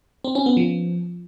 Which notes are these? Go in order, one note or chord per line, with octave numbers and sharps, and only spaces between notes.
C4
C#4
B3
F3